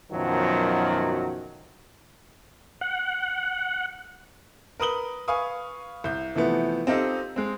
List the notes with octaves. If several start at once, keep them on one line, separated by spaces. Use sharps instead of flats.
F#2 B2 D#3 F3 F#3
F#5
A#4 B4 D#6 F#7 G7
B4 F5 G#5 C#6 D#6
C2 G6
C3 E3 F3 A3 B3
C4 D#4 F4 G4 A4 D#5
G#3 C4